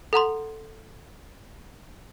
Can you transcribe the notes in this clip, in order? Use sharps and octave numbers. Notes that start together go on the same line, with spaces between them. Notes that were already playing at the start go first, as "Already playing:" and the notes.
A4 F#5 A#5 C6